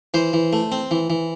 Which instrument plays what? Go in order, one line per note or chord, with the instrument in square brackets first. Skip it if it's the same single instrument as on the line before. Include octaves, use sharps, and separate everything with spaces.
[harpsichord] E3 C5
E3
A3
C4
E3
E3